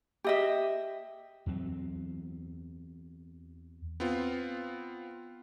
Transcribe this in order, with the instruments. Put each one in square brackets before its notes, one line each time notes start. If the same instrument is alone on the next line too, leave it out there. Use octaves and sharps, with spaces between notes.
[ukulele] G4 D#5 E5
[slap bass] E2 F#3 C4
[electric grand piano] B3 C4 F4